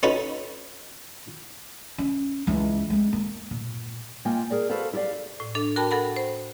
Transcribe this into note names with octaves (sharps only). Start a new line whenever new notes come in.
C#4 D#4 F#4 A4 B4
C#4
C#2 E3
G#3 C4
A#3
A#2
A#3 F4 D#5 G5 G#5
G#4 A#4 D5
F#4 A4 B4 C5 F5
E4 G4 G#4 D5 F5
A2
D4 A4
F#4 A#4 G5 A5 B5
A4 A#4 F#5 B5
C5